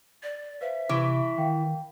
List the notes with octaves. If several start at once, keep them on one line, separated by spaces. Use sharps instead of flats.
D5
B4 C5 E5 F5
C3 E3 C#6 D7
D#3 F5 G5